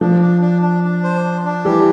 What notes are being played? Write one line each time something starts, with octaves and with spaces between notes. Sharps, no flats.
F3 D4
D4
D4
D4
D4
C5
D4
D4
E3 G3 G4